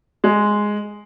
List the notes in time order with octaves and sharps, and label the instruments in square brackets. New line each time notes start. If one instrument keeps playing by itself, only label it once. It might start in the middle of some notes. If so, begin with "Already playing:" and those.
[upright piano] G#3